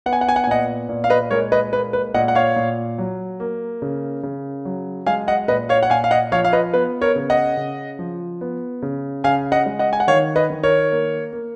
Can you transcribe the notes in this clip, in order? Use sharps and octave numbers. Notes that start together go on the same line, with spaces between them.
B3 F#5
G#5
F#5
G#5
F#5
G#5
A#2 D#5 F#5
A#2
F5
B4 D#5
G#3 A#4 C#5
B4 D#5
A#3 B4
B4
A#2 D#5 F#5
F#5
C#5 F5
A#2
F#3
A#3
C#3
C#3
F#3
G#3 F5 G#5
D#5 F#5
A#2 B4 D#5
C#5 F5
F#5
A#2 F5 G#5
F5
D#5 F#5
F3 C#5 F5
F5
B4 D#5
B3 B4
A#4 C#5
C#3
D#5 F#5
C#3
F3
B3
C#3
C#3 F5 G#5
D#5 F#5
G#3
D#5 F#5
G#5
F#5
D#3 C#5 F5
B4 D#5
D#3
A#4 C#5
A#3
A#3